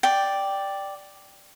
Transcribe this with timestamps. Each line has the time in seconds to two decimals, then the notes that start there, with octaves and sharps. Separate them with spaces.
0.03 D5 G5